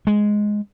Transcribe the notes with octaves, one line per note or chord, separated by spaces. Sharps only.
G#3